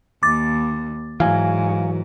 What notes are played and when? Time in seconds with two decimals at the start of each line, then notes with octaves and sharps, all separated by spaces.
0.23 D#2 D6 A6
1.20 G#2 E3 F#3 F5 G#5